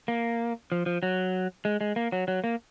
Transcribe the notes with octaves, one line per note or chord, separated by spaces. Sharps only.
A#3
F3
F3
F#3
G#3
G#3
A#3
F#3
F#3
A#3